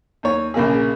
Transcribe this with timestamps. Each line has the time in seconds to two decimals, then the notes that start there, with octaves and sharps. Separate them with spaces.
0.23 D#2 C#5
0.54 A#1 C#3 A#3 G#4